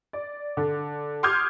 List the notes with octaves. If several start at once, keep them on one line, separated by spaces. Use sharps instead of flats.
D5
D3
C6 D6 D#6 F6 G6 G#6